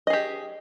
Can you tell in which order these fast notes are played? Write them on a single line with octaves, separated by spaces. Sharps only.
D#5 G#4 G4